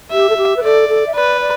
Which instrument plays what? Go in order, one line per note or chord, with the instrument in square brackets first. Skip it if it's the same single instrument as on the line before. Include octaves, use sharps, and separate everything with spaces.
[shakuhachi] G4 [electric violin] E5
[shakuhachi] A4
G4
B4
[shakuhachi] A4 [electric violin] D5
[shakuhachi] A4
E5
[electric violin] B4 [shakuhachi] D5
[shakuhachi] D5